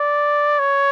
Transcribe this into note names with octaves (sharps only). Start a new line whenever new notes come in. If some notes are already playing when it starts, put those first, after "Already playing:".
Already playing: D5
C#5